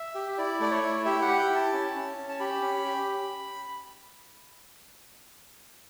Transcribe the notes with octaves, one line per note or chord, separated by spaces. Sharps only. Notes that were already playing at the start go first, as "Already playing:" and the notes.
Already playing: E5
G4
E4 D5
A3 D5
C#5
E4
G4 E5
F#5
G4
G5
E4
A5
C#4
C#4
C#4
A5
G4 B5
C#4
G4